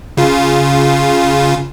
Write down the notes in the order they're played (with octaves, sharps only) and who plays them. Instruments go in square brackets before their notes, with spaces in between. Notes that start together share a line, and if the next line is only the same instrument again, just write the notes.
[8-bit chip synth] C#3 F4